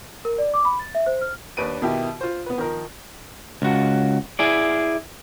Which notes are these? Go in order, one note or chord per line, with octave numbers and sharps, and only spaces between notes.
A#4
D5
D6
B5
A6
E5
C5
F6
D#2 D4 B4 D7 D#7
B2 D#3 E4 G4
F4 C5
B3 B4
D#3 F3 A#4
C#2 F#4
E4 G#4 D5